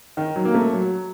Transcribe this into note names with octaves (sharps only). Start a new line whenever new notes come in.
D#3
F#3
A#3
A3
F#3